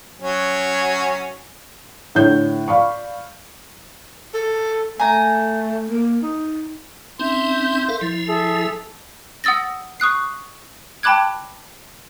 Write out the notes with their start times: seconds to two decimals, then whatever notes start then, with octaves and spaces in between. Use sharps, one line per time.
0.22 F#3 C#4
2.15 A2 D3 C#5 G6
2.68 D5 F5 B5 C#6
4.34 A4
5.00 A3 G#5 A#5
5.90 A#3
6.23 D#4
7.19 C4 C#4 D#4 E5 C6 G6
7.88 A4 A#4 F5
8.01 F3 E4
8.26 G#4 A4 E5
9.44 F#5 D#6 E6 A6 A#6
10.00 C#6 D#6 F#6 C7
11.03 G5 A5 B5 D6 F#6 G#6